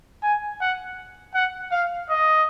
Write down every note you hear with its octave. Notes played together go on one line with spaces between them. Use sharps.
G#5
F#5
F#5
F5
D#5